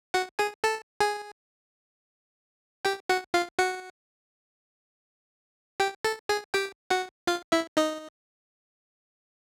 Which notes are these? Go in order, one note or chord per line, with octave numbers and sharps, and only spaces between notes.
F#4 F#5
G#4 G#5
A4 A5
G#4 G#5
G4 G5
F#4 F#5
F4 F5
F#4 F#5
G4 G5
A4 A5
G#4 G#5
G4 G5
F#4 F#5
F4 F5
E4 E5
D#4 D#5